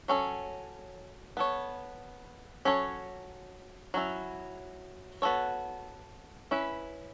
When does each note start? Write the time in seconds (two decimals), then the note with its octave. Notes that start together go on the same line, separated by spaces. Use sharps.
0.08 F#3 C#4 A4
1.37 B3 A4 C#5
2.65 F#3 C#4 A4 C#5
3.94 F#3 C#4 E4
5.22 B3 F#4 A4 C#5
6.51 C#4 E4 B4